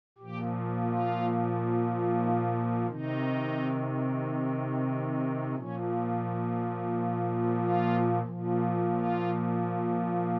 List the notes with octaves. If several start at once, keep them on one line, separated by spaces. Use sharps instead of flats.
A#2 F3 G4
F4
D#4
F4
C3 D#3 D#4
A#2 F3 C#4
F4
A#2 F3
F4